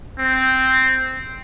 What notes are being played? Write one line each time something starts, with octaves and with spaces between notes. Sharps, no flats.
C4